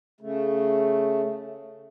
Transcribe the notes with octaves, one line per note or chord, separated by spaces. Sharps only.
C#3 A3